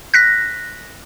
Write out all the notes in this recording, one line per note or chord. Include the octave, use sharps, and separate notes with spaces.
F#6 A#6 B6